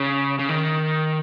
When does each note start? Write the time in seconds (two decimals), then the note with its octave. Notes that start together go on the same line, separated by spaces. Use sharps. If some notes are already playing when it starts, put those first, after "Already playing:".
Already playing: C#3
0.39 C#3
0.49 D#3